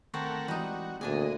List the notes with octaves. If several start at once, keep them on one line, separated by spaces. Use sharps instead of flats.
D#3 A3 C4 A#4 F#5 C#6
E3 G3 G#3 D#4 F#4 D#6
D2 A#2 A#3 D4 G#4 D#5 G#5